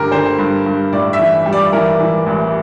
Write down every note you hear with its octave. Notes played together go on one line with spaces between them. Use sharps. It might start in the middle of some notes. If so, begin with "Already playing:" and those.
Already playing: G2 D3 A3 G4 A#4
D3 C5
G2
G2
A2 D5
E5
E3
G3
D5
E3 A#4
E3
A1